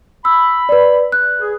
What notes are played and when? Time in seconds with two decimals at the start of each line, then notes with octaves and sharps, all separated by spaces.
0.25 B5 E6
0.69 B4 D5
1.12 F#6
1.40 G#4